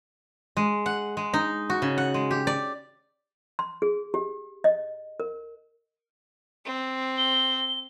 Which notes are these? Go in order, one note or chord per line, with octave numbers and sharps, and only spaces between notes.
G#3
F#5
G#3
D#4
F#4
C#3
F#5
G#3
G4
D5
C6
G#4
G4
D#5
A#4
C4
G7